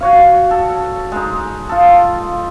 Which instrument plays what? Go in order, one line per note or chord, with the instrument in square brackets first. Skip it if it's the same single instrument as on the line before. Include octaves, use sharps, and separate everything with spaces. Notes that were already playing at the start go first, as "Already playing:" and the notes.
[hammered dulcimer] F#4 C#5 F5
A4
G#3 D#4
F4 A4